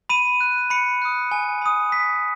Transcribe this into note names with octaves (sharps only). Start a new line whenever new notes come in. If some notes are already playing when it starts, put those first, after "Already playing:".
B5 D#7
F#6
B5 C#7
D#6 F#6
G#5
B5 D#6
G#5 B6